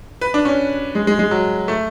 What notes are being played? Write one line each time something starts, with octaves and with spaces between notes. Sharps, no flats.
B4
D4
C#4
G#3
G#3
G#3
F#3
A3